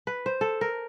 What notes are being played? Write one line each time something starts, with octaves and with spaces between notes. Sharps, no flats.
B4
C5
A4
A#4